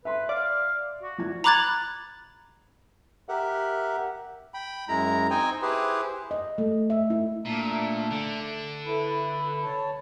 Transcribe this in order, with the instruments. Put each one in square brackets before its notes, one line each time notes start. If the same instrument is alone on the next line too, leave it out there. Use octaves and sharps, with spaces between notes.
[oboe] B4 [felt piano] E5 C6
[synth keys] D5 [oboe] F5
[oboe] F#4
[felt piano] F3 E4 G#6
[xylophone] A#5 B5 D6 F#6 G#6 A6
[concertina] G4 A#4 E5 F#5
[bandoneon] G5 B5
F#2 G#3 E4 A#5
C4 D#4 C5 D#5 G5 G#5
E4 G4 G#4 B4 C5
[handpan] D#5
A3
E5
E4
[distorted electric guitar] A#2 [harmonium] A3 D4 E5
[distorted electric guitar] D3
[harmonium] E4 [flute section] A4 B4 B5
[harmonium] C#5 A5